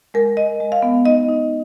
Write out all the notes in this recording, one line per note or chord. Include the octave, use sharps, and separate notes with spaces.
G#3 A#4
G#3 D#5
G#3
F5
B3
D#4 D#5
D#4